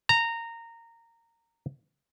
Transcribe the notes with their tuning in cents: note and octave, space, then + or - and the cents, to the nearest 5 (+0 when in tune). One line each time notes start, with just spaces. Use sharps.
A#5 -15